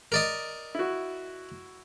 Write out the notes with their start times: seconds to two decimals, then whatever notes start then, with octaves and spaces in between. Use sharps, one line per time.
0.12 A#4 D5 D#5
0.75 E4 F#4